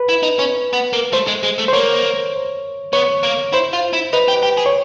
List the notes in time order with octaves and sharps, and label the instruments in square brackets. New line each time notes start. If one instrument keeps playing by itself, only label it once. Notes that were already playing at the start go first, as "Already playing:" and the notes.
Already playing: [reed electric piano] B4
[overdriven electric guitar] E4
D#4
C#4
B3
A#3
[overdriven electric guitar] A3 [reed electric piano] C5
[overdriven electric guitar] G#3
G#3
A3
[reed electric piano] C5
[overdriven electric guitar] A#3 [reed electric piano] C#5
[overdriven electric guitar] B3 [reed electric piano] C#5
[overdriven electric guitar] A#3
[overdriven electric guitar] E4 [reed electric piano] C5
[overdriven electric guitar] F4
E4
[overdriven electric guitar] D#4 [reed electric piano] B4
[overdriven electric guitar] G4
G4
G#4
[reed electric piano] C#5